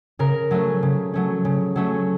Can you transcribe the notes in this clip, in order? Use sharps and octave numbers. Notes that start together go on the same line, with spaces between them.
C#3 A#4
F#3 A3 C#4
C#3
F#3 A3 C#4
C#3
F#3 A3 C#4